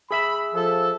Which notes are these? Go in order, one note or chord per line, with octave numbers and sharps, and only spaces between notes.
G#4 E5 B5 E6
F3 A4